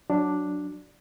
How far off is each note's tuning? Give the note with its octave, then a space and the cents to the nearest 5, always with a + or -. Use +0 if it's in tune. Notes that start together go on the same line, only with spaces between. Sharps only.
F#3 +0 D4 +0